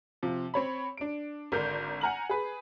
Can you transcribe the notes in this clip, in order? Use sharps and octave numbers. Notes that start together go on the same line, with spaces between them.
C3 F3
C4 C#5 B5
D4 D7
G#1 D3 D4 A#4 G6
F#5 G#5 A#5 F6 F#7
G#4 B4